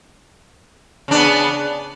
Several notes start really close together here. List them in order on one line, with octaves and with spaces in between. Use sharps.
C#3 D4 B3